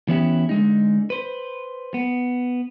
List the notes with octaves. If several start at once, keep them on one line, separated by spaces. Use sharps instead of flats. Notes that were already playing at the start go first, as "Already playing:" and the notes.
E3 B3 C#4 E4 G4
D3 G#3 D#4
B4 C5
B3